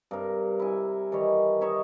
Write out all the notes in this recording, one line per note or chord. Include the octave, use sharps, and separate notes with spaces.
G2 C3 A#4
E4 G#5
D#3 E3 G3 C#5
D#4 C#5 E5